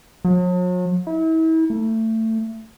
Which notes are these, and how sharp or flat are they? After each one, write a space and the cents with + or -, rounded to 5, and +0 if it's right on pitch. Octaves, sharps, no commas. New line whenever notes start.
F#3 -45
E4 -40
A3 +20